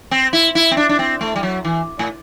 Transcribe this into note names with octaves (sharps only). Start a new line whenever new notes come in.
C4
E4
E4
C4
D4
D4
C4
A3
G3
F#3
E3
A2